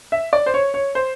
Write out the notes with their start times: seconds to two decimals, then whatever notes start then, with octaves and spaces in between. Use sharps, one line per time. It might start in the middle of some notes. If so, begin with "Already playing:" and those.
0.12 E5
0.33 D5
0.46 C5
0.54 C#5
0.74 C#5
0.95 C5